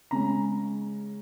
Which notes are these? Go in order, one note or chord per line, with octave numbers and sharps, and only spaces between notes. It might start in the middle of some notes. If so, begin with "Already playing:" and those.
C#3 G#3 C#4 A#5